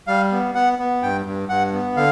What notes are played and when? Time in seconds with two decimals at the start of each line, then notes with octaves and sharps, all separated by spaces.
0.07 G3 F5
0.32 B3
0.55 B3 F#5
0.79 B3
1.03 G2 G5
1.26 G2
1.49 G2 F#5
1.73 B3
1.97 D3 F5